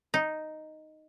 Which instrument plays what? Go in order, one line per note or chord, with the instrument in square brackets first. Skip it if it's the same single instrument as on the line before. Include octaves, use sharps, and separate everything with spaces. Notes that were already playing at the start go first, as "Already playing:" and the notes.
[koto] D#4